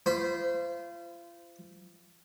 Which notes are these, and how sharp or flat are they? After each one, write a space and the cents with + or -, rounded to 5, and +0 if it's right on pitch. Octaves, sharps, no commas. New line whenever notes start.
F4 -35 C5 -20 B5 +0